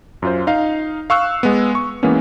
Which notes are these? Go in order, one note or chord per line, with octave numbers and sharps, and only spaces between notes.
F#2 F4 C5
D#4 F5
F5 C#6 E6 F#6
G#3 B3
C#6
E3 G#3 A#3 B3 C#4